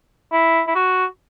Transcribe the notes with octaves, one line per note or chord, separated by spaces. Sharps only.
E4
E4
F#4